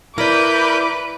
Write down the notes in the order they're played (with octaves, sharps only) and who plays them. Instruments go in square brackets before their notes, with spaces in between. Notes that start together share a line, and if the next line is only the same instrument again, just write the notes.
[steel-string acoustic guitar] E4 D5 [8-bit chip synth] A#4 B5 G6 [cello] B4 [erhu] D6